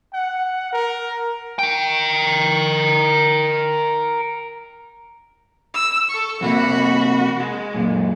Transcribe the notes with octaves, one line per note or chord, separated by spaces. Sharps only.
F#5
A#4
A#4 G5
E6
A4 C#6
F2 C3 A#3 F#4 B5
G#3
F#2 A#2